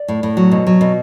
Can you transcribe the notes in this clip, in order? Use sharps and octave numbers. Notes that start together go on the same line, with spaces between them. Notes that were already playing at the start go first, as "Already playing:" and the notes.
Already playing: D5
A2
A2
F#3
B2
F#3
B2